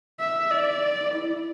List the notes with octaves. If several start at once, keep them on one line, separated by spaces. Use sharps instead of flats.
E5
D5
E4